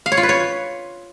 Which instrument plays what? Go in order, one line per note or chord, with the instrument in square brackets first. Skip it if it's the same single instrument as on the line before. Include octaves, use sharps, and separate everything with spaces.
[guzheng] F5
C#5
F4
B4
C#5